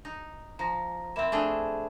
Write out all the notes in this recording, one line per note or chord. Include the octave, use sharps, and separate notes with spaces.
D#4
F3 A#5 A#6
A#3 C4 E5 B5 E7
A3 D4 G#4